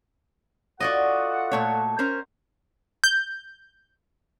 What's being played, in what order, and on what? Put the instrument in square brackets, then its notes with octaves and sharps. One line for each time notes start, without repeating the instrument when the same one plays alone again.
[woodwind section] F4 A4 F#5 [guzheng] F#4 D5 D#5
[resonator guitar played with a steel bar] A#2 A3 C#5
C#4 A#4 C5
[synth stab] G6